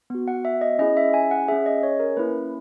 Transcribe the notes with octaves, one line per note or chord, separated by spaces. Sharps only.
B3 F#4
F#5
E5
D#5
C#4 E4 G#4 D#5
E5
G#5
F#5
C#4 G#4 E5
D#5
C#5
A#4
A#3 C#4 E4 B4